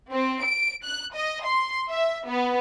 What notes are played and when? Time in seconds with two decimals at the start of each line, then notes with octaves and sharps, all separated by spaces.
0.11 C4
0.42 D7
0.84 F#6
1.15 D#5
1.44 C6
1.91 E5
2.28 B3